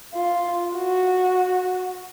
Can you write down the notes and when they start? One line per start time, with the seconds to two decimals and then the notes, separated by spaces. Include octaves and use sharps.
0.14 F4
0.76 F#4